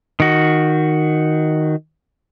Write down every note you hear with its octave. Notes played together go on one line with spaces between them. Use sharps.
D#3 F#4